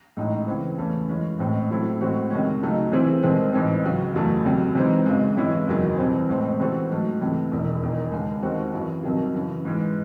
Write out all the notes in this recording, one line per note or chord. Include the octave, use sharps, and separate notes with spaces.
A1 A2 G#3 D#4
C#2 C#3 E3 C4
E2 C#3 E3 A3 C#4
F#2 E3 G#3 C#4
A1 A2 G#3 C4
A2 F#3 C4 E4 A4
A2 G#3 C4 F#4
C#2 C3 D#3 G#3 C#4
C#2 C#3 F#3 A3 D#4
C3 E3 C4 E4 G#4
C2 C3 D#3 G#3 C4
A1 G#2 E3 C4
C#2 C#3 F#3
F#1 E2 C#3 F#3 A3
C#2 C3 F#3
C3 E3 G#3 C4 D#4
G#1 F#2 C#3 G#3
C3 E3 G#3 C#4 E4
F#1 E2 D#3 F#3
C2 C3 E3 C4
A1 A2 G#3 C4
C3 E3 C4 F#4 A4
G#2 F#3 A3
C#2 C3 E3 A3
E1 E2 D#3
E1 E2 D#3
D#2 C#3 G#3
D#2 D#3 G#3 C4 F#4
G#1 F#2 E3
C2 C3 D#3 F#3
F#2 C#3 E3
G#2 E3 G#3